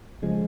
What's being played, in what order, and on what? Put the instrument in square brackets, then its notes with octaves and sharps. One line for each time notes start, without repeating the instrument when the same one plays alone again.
[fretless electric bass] C#3 F3 G#3